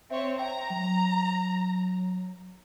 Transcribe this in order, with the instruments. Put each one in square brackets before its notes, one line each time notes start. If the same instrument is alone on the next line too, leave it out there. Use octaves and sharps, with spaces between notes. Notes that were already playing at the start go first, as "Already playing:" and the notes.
[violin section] C4 C#5 [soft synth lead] E5
[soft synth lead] G5 [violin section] A#5
[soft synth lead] F#3